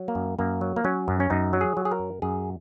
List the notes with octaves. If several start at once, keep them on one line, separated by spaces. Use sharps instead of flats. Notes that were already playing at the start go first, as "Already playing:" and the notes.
Already playing: F#3
A#3
F#2
F#2 A#3
F#3
A#3
F#3 C#4
F#2
C#4
F#2 D#4
F#3
G#4
F#3
G#4
A#4
F#2
F#2 G#4